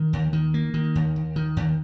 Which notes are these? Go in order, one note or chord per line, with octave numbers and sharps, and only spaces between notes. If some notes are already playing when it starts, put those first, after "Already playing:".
Already playing: D#3
D#2
D#3
A#3
D#3
D#2
D#2
D#3
D#2